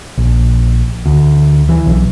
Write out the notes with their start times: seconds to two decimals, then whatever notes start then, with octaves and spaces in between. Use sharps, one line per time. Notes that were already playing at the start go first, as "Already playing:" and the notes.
0.18 A#1
1.06 D2
1.69 E3
1.86 B1